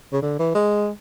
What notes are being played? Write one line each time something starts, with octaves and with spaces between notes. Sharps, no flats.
C#3
D3
E3
G#3